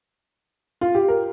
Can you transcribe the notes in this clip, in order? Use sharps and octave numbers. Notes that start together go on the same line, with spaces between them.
F4
G4
A#4